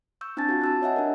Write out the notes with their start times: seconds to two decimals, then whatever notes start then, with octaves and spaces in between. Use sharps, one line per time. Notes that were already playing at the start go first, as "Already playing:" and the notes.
0.21 C#6 E6 G6
0.37 C4 D4 E4 G#5 A5 A6
0.49 C4 F4 F#4
0.62 A5 E6 F#6
0.82 C#5 D#5 E5 F#5 G#5
0.96 D4 G4 A#4